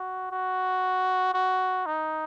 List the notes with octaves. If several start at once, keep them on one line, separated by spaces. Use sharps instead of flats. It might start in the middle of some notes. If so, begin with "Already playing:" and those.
Already playing: F#4
F#4
F#4
D#4